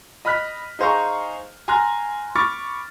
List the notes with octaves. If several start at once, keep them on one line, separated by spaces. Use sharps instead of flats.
D#5 B5 F6 F#6 B6
D#4 G#4 C5 F5 A#5 C#6
G#5 A#5 C6 F6 F#6 A#6
B5 C#6 D6 F6 A6